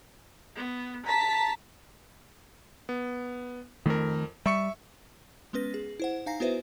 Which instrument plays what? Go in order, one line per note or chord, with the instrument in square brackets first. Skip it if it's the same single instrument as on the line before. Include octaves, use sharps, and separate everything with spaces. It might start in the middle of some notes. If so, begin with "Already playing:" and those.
[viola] B3
[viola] A5 [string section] A#5 B6
[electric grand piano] B3
[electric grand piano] F2 A#4 [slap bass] D#3 A3
[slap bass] G3 [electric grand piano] E5 C#6 C#7
[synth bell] G#3 B3 C#4 B4 A#6
G#4
E4 C5 F#5
D#4 F5 G#5 A#5 A#6 C7
B3 E4 F#4 B4 C5 E5